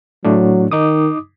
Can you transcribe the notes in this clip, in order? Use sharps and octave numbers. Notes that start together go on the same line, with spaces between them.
A2 F#3 A3 D4
D#3 D#4 D6 D#6